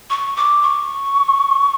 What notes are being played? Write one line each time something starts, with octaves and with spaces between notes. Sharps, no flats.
C#6
D6
C#6